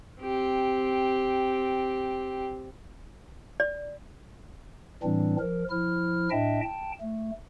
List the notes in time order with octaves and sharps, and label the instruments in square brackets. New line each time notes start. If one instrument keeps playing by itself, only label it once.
[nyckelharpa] C4 G4
[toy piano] D5
[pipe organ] A2 E3 G3 C4 D4
F3 A#4
F3 E4 F6
A2 D4 D#5 E5 G5 A5
G5 A5
A3